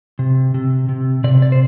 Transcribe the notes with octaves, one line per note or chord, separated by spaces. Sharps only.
C3
C3
C3
C3 D5
D5
C5